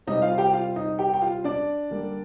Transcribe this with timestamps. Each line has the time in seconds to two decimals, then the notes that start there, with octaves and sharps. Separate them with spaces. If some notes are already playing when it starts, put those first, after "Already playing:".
0.07 C3 G3 C4 D#4 D#5
0.22 F4 F5
0.38 G4 G5
0.53 F4 F5
0.76 D#4 D#5
0.99 G4 G5
1.14 G5
1.22 F4 F5
1.44 D4 D5
1.91 D3 G3 A#3